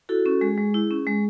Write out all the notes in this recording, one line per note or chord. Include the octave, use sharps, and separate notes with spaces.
E4 F#4 A4
C#4
G#3 G#4
G#3
E4
C#4
G#3